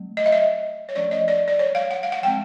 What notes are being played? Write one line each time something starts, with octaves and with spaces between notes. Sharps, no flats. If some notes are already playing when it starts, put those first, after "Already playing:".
Already playing: F#3 A3 C4
D#5
E5
D#5
C#5
F3 A3 C#4 D5
D#5
D5
D5
C#5
F5
F#5
F5
F#5
F3 G#3 C4 G5